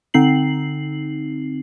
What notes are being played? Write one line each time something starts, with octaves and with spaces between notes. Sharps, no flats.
D3 C4 D#4 C7 F#7